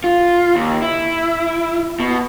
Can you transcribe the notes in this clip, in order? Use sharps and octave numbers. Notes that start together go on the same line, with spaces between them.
F4
D#2
E4
B2